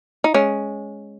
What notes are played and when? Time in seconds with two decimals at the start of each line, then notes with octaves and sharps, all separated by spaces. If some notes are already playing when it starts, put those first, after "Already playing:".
0.24 D#4
0.34 G#3 C#4